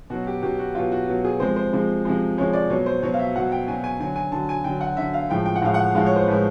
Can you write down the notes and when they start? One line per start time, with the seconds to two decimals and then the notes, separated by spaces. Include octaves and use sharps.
0.10 B2 F#3 F#4
0.27 G4
0.43 B2 F#3 G4
0.58 F#4
0.75 B2 F#3 F4
0.92 F#4
1.08 B2 F#3
1.25 G#4
1.40 C3 F3 G#3 C5
1.56 C5
1.73 C3 F3 G#3
2.05 C3 F3 G#3
2.38 C3 F3 G#3 C#5
2.53 D5
2.70 B2 F#3 C#5
2.86 C5
3.03 B2 F#3 C#5
3.14 F5
3.19 E5
3.35 B2 F#3 F#5
3.52 G5
3.68 B2 F#3 G#5
3.84 G#5
4.00 D3 F#3 G#5
4.16 G#5
4.32 D3 F#3 A5
4.49 G#5
4.64 D3 F#3 G5
4.81 F#5
4.97 D3 F#3 E5
5.14 F5
5.29 A2 F3 G#3 G5
5.46 G5
5.56 F#5
5.62 A2 F3 G#3 F5
5.74 F#5
5.95 A2 F3 G#3 F5
6.06 C#5
6.16 C5
6.27 A2 F3 G#3 B4